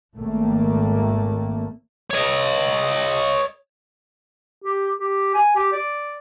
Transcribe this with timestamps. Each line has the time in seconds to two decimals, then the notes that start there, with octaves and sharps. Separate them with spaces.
0.14 G#1 A3 A#3
2.10 C#5 D#5
4.62 G4
4.98 G4
5.34 G#5
5.56 G4
5.72 D5